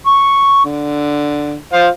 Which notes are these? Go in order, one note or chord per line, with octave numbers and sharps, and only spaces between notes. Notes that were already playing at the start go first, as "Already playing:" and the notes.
C#6
D3
F4 C5 F5